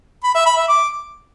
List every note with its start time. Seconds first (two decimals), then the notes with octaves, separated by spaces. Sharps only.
0.24 B5
0.35 E5
0.46 B5
0.57 E5
0.68 D6